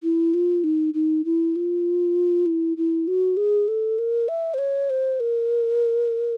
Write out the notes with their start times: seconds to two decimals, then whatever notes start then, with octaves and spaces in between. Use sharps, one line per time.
0.03 E4
0.34 F4
0.64 D#4
0.94 D#4
1.25 E4
1.56 F4
2.46 E4
2.77 E4
3.07 F#4
3.37 G#4
3.68 A4
3.99 A#4
4.28 E5
4.54 C5
4.58 C#5
4.90 C5
5.20 A#4